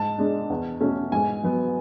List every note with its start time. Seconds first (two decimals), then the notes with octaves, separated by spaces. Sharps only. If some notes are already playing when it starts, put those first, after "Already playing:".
Already playing: G#2 A5
0.18 G#3 D4
0.50 E2
0.81 B2 A3 C#4
1.12 G#2 G#5
1.43 F#3 B3